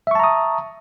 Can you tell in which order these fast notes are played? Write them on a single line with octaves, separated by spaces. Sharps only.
E5 C#6 A5 A#5 D#6